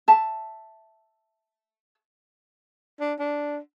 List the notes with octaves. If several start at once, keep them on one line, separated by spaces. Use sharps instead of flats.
E5 A5
D4
D4